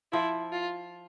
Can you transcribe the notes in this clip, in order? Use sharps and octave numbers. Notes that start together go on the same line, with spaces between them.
F3 E4
F4